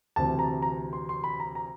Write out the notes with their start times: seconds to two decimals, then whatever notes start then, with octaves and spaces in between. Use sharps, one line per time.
0.16 D2 C3 E3 A5
0.39 A#5
0.62 A#5
0.93 C6
1.09 C6
1.24 B5
1.40 A#5
1.55 A#5